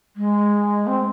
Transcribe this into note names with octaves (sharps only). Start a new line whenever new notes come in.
G#3
C4